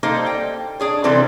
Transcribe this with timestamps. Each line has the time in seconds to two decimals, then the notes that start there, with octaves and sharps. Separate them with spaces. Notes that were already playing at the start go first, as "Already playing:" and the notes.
0.03 G3 A#3 D#4 A4 C5 D#5
0.26 G5
0.80 D4 G#4 C#5
1.04 C3 E3 G3 C4 A4 C5